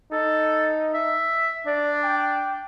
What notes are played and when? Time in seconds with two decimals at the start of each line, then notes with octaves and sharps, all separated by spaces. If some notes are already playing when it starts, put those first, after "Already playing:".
0.12 D#4 A4
0.94 E5
1.66 D4 D5
2.03 G5